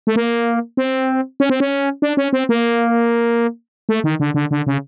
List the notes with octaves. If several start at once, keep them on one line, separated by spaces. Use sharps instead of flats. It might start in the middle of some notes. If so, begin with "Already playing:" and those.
A3
A#3
C4
C#4
C4
C#4
D4
C#4
C4
A#3
A3
D#3
D3
D3
D3
C#3